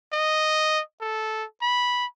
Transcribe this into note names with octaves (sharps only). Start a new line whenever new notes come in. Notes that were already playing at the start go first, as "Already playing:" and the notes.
D#5
A4
B5